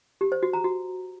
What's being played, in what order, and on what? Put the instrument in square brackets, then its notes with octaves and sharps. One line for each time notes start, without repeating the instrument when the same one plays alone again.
[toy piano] G4
C5
F#4
A#5
F#4